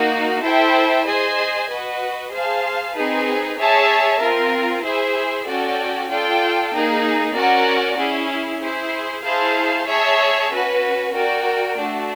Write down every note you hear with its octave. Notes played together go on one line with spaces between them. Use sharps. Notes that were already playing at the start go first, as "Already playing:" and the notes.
Already playing: A#3 D#4 F#4
E4 A4 C5 E5 G5
G#4 C5 D#5 G#5
F#4 B4 D#5
G#4 C5 F5 A5
C4 D#4 G#4 B4
G#4 C#5 E5 A5
C4 F4 A#4
E4 G#4 C5 E5
C#4 F#4 A4 D5 G5
F4 A4 D5 G5
A#3 D#4 G#4
C#4 F#4 A#4 D5 F#5
C#4 E4 G#4
E4 G#4 C5
E4 G#4 C5 F5 A5
G#4 C#5 E5 A5
C#4 F#4 B4
F#4 A#4 D5 G5
A3 D4 F#4